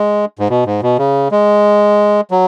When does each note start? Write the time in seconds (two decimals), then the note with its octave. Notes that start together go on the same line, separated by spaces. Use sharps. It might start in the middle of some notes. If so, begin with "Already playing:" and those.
Already playing: G#3
0.39 G#2
0.49 B2
0.66 G#2
0.82 B2
0.99 C#3
1.31 G#3
2.31 F#3